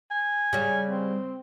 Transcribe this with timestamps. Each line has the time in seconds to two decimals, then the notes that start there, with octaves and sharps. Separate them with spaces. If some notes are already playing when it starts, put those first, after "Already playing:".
0.11 G#5
0.53 C#3 G3
0.88 C4